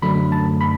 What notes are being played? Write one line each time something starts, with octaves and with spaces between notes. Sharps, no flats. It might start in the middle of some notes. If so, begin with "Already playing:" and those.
F#2 D3 F#3 A3 D4 B5
A5
B5